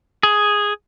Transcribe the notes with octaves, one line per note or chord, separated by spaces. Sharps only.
G#4